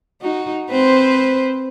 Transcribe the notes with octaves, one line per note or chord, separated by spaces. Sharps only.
D#4 F#4
C4 B4 C5